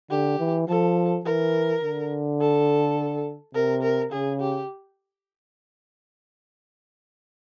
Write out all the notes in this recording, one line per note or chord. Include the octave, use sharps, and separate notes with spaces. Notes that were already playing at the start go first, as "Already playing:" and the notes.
D3 G4
E3
F3 A4
E3 A#4
D3
A4
C3 A#4
A#4
C#3 G#4
G4